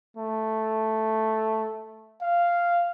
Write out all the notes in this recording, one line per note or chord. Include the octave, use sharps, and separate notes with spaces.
A3
F5